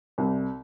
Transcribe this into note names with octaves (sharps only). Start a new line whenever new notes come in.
C2